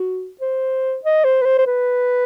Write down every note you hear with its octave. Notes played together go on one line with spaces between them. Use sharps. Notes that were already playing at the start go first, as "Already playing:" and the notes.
Already playing: F#4
C5
D#5
C5
B4
C5
C5
B4